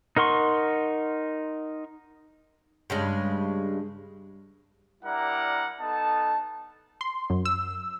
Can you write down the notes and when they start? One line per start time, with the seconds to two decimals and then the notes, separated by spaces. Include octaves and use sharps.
0.17 D#4 A#4 F#5 C6 C#6
2.90 G2 C#3 G#3
5.04 G3 D4 E4 A#4 F#5 A#5
5.80 B3 D#4 A4 A5
7.01 C6
7.30 F#2
7.45 E6